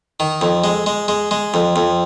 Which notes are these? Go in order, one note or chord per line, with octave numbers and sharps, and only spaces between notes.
D#3
F2
G#3
G#3
G#3
G#3
F2
F2